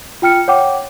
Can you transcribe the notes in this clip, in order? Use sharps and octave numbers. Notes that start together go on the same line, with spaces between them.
F4 G5 F6 C#7
C#5 F#5 G5 D6